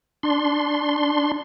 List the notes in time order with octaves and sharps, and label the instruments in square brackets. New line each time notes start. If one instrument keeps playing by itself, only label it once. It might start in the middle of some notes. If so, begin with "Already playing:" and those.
[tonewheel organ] D4 C6